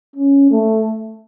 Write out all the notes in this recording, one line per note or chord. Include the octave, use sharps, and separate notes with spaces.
C#4
A3